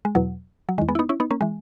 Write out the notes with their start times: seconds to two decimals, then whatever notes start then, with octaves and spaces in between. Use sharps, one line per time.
0.05 G#3
0.15 E2 B2 F#3
0.69 F#3
0.78 E2 D#3 G#3
0.88 G#3 B3
0.95 E4
0.99 B3 D#4
1.09 C#4 E4
1.20 B3 D#4
1.31 A#3 C#4
1.41 E3 G#3